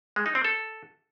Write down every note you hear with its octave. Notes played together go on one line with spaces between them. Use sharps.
G#3
D#4
C4
A4